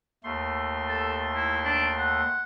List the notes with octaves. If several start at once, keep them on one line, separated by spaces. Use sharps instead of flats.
D#2 A3 C6
A4
E4
D4
F#5